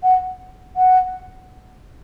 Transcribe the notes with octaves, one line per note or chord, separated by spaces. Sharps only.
F#5
F#5